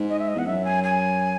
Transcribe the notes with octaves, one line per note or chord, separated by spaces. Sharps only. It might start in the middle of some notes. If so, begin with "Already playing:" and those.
Already playing: G#2
D#5
E5
D#5
E2 F#5
F#2 E5
G#5
G#5